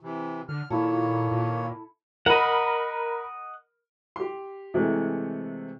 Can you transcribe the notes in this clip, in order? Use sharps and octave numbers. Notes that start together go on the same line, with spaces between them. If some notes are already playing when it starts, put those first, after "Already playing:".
C3 E3
D3 F6
A#2 D#3 A#3 E4 A4 C#5
A#2
A#4 D#5 F#5 B5
G4 C6
C3 E3 G#3 A3